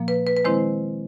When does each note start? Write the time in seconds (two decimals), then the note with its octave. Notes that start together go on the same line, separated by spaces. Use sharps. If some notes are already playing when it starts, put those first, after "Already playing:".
Already playing: A#2 F3 A#3
0.08 B4
0.27 B4
0.37 B4
0.45 D#3 G#3 C4 E4 C5